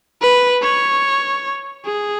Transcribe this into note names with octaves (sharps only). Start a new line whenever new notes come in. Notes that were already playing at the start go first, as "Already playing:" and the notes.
B4
C#5
G#4